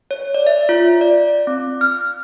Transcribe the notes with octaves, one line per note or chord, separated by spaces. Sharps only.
C#5
D5
E5
F4
D5
C4
F6